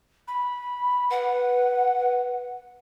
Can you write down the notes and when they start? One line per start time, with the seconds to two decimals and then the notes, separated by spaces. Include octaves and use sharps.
0.28 B5
1.10 B4 F#5